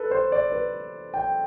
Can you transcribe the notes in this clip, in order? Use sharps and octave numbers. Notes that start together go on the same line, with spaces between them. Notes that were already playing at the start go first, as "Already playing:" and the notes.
Already playing: A4 B4
C5
D5
B4
G5